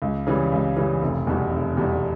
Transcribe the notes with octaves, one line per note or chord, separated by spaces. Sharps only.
C#2
C#3 E3 G3
C#2
C#3 E3 G3
F1
E2 B2 G3
F1
E2 B2 G3